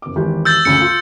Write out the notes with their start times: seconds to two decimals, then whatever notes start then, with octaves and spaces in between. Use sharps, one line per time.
0.02 F#1 D6
0.16 G#1 E2 G4
0.45 E6 G6 A6
0.65 D2 C#3 C#7
0.81 F4